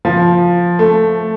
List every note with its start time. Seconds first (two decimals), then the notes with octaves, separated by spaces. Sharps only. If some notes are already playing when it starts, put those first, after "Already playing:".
0.05 F3
0.79 A3